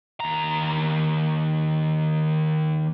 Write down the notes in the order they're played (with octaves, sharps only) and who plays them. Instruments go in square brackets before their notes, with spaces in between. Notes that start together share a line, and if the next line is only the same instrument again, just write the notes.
[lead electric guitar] D#2 A#5